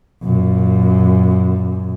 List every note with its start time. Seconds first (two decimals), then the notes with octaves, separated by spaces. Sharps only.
0.23 F#2 A#2